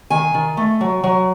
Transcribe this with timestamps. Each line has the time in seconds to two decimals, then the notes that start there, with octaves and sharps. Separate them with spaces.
0.10 D#3 G#5
0.34 D#3
0.57 A3
0.81 F#3
1.04 F#3